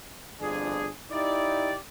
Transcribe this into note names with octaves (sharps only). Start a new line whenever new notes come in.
G1 F2 D4 G#4
D#4 E4 G4 D5